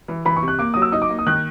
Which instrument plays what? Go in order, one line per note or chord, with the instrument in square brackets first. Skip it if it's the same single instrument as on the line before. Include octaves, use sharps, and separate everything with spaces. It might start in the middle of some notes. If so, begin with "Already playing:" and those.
[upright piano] E3
[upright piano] E3 [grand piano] B5
[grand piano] C#6
[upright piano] C3
[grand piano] F#6
[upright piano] A#3 [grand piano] D6
[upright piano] F#3 [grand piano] D#6
[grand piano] E6
[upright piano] D#4 [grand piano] D#6
[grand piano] D6
[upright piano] A#3
[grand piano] D#6
[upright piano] D#3 [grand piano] F#6